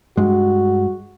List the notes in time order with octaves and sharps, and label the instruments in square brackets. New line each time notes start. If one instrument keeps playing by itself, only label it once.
[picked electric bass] G2 G#3 [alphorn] F#4